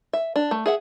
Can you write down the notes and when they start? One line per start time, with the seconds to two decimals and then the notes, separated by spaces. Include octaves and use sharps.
0.13 E5
0.36 D4
0.51 A3
0.66 G#4 E5 F#5